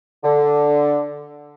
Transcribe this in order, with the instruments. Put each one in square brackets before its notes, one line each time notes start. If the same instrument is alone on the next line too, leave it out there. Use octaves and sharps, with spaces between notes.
[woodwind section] D3